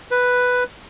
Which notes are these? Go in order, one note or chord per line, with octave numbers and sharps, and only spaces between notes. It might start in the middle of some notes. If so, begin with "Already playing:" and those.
B4